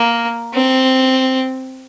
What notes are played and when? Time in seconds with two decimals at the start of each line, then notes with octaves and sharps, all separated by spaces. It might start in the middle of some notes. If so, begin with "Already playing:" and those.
Already playing: A#3
0.54 C4